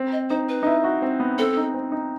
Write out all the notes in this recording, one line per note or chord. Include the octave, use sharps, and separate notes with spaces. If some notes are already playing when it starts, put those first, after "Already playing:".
Already playing: C4
D#5
D#4 C5
B4
D#4
E4
F#4
C4
B3
C4 A4
D#4
C4
D#4